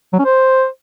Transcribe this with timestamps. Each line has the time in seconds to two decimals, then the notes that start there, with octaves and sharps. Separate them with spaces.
0.13 F#3
0.19 C#4
0.25 C5